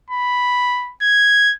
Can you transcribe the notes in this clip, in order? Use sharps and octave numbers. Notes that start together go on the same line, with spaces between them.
B5
G#6